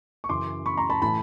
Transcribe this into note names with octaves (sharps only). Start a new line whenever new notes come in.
C#6
F#2 C#3 E3 C6 D6
B5 C#6
A#5 C6
A5 B5
A2 E3 A5 B5